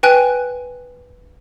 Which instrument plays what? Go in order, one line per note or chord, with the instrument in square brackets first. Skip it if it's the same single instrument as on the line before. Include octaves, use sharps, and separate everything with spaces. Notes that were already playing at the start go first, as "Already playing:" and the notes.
[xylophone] B4 G5 G#5 F#6